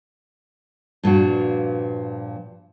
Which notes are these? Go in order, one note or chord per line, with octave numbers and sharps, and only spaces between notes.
G2 A#2 F3 F#4